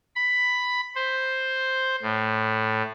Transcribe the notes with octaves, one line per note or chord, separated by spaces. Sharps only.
B5
C5
A2